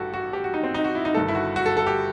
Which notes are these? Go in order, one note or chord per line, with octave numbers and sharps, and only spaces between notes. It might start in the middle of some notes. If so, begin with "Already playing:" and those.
Already playing: A1 G2 D#3 F#4 G4 A4
F#4
G4
F#4
D#4
C4
D#4
F#4
E4
D#4
G1 G2 D#3 A4
E4
F#4
F#4
A4
A4
G4